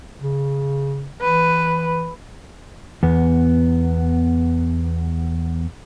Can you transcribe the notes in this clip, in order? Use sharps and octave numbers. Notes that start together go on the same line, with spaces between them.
C#3
E3 B4
E2 B3